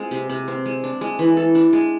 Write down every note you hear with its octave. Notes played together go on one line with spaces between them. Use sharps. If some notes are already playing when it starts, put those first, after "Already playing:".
Already playing: G#3 C4 F4
C3
C3
C4
G#3
D4
G#3
E3
A4
D4
G#3